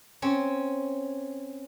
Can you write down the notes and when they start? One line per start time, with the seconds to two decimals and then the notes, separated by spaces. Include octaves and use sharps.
0.22 C4 C#4